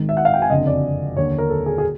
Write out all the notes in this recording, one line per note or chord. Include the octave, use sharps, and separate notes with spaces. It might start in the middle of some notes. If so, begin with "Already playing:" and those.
Already playing: G#1 G#2 D#3
E5
F#5
F5
G5
G#5
F#1 F2 D3 D#5
D5
D#2 D3 C#5
A#4
A4
G#4
G#4